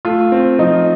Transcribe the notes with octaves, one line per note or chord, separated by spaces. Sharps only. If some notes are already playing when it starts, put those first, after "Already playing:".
A3 F4
C4
F3 D#4